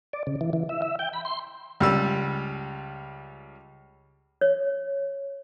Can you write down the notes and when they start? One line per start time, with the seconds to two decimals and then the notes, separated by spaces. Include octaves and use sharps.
0.13 D5
0.27 C#3
0.41 E3
0.53 E3
0.69 E5
0.82 E5
0.99 G5
1.13 B5
1.25 C6
1.80 C#2 G3 E6
4.41 C#5